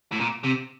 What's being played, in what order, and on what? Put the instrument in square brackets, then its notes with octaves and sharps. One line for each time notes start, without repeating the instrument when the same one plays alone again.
[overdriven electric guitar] A2
A#2
C3